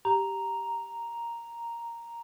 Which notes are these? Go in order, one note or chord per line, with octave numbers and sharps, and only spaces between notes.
G4 A#5